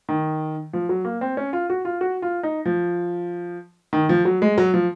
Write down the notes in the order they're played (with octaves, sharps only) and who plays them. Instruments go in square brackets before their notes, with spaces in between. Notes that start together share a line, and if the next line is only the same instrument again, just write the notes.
[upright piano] D#3
F3
F#3
A#3
C4
C#4
F4
F#4
F4
F#4
F4
D#4
F3
D#3
F3
F#3
G#3
F#3
F3